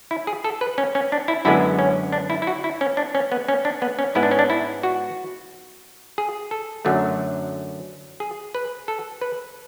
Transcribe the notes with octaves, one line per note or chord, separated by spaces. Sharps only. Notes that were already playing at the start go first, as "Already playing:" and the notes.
E4
G#4
A4
B4
C#4
C#4
D4
E4
F#2 D3 G#3 B3 E4
C#4
D4
E4
E4
F#4
E4
C#4
D4
C#4
B3
C#4
D4
B3
C#4
G#2 G#3 B3 E4
D4
C#4
D4
E4
F#4
G#4
A4
F#2 D3 F#3 A3
G#4
B4
A4
B4